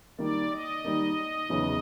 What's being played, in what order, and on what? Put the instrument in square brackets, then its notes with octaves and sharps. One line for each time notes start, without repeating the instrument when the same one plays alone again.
[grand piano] D#3 G3 A#3 D#4 [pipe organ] D5
[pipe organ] D#5
[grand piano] D#3 G3 A#3 D#4
E2 C#3 F#3 B3 D#4